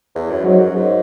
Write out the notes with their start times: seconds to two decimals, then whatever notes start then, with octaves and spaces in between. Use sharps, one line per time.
0.15 E2
0.30 F#2
0.44 G#2 F#3
0.60 F#2
0.75 G#2